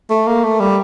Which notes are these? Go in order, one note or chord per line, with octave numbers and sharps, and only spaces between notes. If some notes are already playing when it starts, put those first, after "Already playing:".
A3
A#3
A3
G3